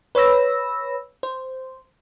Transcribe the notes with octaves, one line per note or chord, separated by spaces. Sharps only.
B4 C#5 B5 E6 A#6
C5